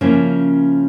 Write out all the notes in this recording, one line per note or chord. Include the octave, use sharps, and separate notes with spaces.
C#3 F3 A#3 C#4 E4